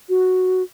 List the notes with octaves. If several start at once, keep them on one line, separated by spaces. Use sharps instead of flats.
F#4